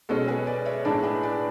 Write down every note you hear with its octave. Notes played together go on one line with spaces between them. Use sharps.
B2 G#3 C#4 F#4 A4
G#4 B4
B4 D5
C#5 E5
A2 G#3 D4 B4 D5
G#4 B4
B4 D5